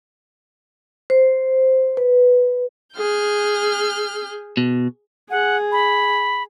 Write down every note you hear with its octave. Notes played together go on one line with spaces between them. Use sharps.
C5
B4
G#4 F6 G6
B2
G#4 F#5
B5